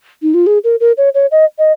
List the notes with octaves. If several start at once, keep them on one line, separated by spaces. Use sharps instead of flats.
D#4
F4
G#4
A#4
A#4
C#5
C#5
D#5
D#5